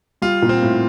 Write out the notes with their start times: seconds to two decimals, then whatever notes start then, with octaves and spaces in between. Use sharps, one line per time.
0.22 G3 F4
0.42 A#2
0.49 C4
0.62 A2